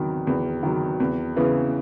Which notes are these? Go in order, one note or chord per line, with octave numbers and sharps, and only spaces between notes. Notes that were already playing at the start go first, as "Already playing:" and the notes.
Already playing: E2 D#3 F#3
E2
D#3 F#3
E2
C#3 E3 B3